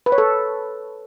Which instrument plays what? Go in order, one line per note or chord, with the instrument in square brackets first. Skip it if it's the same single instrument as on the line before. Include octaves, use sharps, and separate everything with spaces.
[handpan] B4
C#5
A4